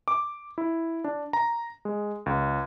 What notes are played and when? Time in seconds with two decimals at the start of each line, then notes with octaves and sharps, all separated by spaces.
0.08 D6
0.58 E4
1.04 D4
1.33 A#5
1.85 G#3
2.26 C#2